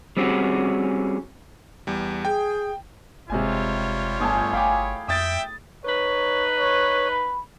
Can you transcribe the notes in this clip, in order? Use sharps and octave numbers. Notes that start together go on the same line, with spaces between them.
G3 C4 C#4 F#4 G#4
E2 G3
G#4 G5
F#1 C3 G3 G#3 F4 C#5 G#5
G1 A2 G#4 G#5 A5 D6
G1 F5 G5 G#5 B5 D6
F2 E5 G5 D#6 A6
D#4 B4 C#5
C#5
B5